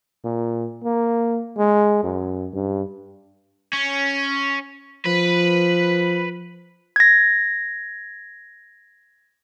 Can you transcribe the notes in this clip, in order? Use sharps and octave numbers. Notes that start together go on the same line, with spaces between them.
A#2
A#3
G#3
F#2
G2
C#4
F3 B4
G#6 A#6